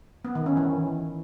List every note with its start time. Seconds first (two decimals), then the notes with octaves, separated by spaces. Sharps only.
0.25 B3
0.35 D#3
0.46 C#4
0.57 E3